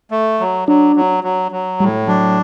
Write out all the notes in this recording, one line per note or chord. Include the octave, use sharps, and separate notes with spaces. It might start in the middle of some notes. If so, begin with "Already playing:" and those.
A3
F#3
F#3 D4
F#3
F#3
F#3
A2 G3
F#3 D4